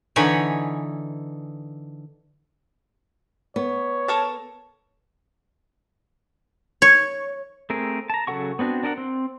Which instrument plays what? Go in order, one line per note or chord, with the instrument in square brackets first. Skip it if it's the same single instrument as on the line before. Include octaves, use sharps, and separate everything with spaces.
[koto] D3 E3 D#4 B4 C#5 G#5
[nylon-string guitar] B3 [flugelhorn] C#5
[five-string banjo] A4 A#4 A5
[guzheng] C#5
[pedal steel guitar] A3 C4 G#4 A#4
A5 A#5
C#3 F#3 A4 F#5 C#6
B3 C4 D4 F#4
D4 A#4 D#5 F#5
C4